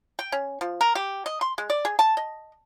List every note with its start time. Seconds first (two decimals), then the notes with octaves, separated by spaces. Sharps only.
0.19 G5
0.32 C#4
0.61 F3
0.81 A#4
0.95 G4
1.26 D#5
1.41 C6
1.58 G#3
1.70 D5
1.85 G#4
1.99 A5
2.17 D#5